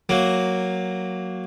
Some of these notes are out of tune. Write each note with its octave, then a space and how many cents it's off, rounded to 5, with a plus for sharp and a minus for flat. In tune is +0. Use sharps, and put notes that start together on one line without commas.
F#3 +0 A#3 +0